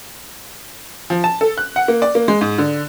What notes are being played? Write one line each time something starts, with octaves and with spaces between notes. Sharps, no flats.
F3
A5
A4
F#6
F#5
A#3
D5
A#3
G#3
G#2
D3